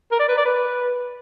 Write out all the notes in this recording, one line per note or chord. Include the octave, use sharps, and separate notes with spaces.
A#4
D5
B4
D5
B4